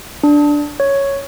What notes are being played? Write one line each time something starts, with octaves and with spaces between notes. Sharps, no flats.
D4
C#5